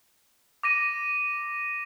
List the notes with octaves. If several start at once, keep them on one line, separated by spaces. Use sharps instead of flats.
D6 A#6 D#7